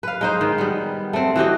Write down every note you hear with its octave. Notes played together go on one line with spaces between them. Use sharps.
B4 F5
G#3 D#4 C5
D#3
G3 B3
A3 C4
E3 F#4 G4 D#5